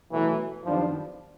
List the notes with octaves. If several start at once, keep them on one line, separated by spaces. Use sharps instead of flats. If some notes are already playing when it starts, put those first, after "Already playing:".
B2 E3 F#3 A3
F#2 D#3 F3 G3 B3 D4